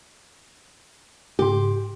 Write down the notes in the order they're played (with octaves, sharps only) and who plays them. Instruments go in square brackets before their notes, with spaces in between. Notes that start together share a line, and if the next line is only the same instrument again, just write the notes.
[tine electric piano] G#2 C#3 C6 [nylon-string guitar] G4